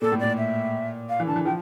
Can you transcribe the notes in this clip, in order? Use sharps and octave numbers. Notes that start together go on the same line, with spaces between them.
A#2 A4
A2
A#2 D5
E5
F5
E3
D3 A5
E3
F3 G5